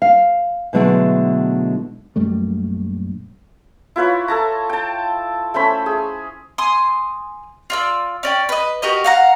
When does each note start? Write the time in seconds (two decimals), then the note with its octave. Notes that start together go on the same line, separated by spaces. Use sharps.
0.02 F5
0.73 B2 D3 F#3 G#3 A3 E4
2.16 A#1 F#2 G3 A3
3.96 E4 F4 B4 C#5
4.28 A4 A5 A#5
4.69 G5 A5
5.54 A3 C#4 C5 B5
5.86 G#4
6.58 G#5 C6 D#6
7.70 F4 D5 E6
8.23 C#4 D5 G5
8.49 B4 D#5
8.82 F#4 G4 A#4 D#5
9.04 F5 F#5 A#5